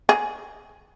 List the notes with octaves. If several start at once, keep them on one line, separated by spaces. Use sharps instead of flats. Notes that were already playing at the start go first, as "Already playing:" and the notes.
G#4